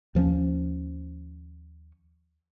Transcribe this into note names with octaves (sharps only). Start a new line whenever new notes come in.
D#2 F3 C4 C#4